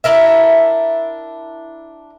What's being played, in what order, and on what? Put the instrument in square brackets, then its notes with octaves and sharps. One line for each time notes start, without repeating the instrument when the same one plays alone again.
[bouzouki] D4 E4 A#4 E5